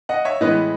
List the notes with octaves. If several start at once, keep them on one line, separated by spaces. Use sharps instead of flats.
D#5 F#5
C#5 E5
A2 E3 G#3 B3 B4 D#5